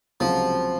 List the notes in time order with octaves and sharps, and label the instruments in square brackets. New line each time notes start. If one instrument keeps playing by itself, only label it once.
[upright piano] C#2 C3 F#3 [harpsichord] F3